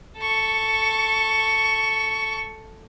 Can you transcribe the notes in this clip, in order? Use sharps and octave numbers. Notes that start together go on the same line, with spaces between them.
A4 C#6